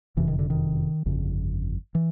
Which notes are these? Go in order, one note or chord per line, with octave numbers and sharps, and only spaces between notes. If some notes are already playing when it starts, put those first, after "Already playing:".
F#1 F2 C3 E3
D#3
D3
D#3
G1 F2 C#3
E3